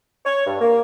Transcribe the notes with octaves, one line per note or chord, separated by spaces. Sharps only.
C#5
G2
A#3